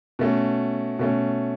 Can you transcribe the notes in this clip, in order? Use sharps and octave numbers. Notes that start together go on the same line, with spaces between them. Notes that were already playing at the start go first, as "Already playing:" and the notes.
B2 A3 C#4
B2 A3 C#4